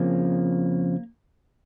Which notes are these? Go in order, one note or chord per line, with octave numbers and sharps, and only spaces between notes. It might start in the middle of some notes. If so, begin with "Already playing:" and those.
Already playing: F2 C#3 F3 A#3